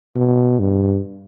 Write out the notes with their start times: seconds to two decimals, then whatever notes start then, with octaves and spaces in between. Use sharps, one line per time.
0.16 B2
0.60 G2